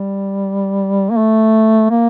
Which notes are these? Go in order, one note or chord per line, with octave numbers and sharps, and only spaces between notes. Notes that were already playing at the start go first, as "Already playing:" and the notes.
Already playing: G3
A#3
A3
A#3